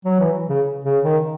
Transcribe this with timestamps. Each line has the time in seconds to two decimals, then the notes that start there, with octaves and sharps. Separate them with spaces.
0.05 F#3
0.20 E3
0.49 C#3
0.84 C#3
1.04 D#3